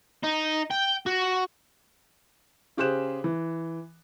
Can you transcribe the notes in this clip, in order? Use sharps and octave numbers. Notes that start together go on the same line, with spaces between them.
D#4
G5
F#4
C#3 G4 G#4 C5 F#6 E7
E3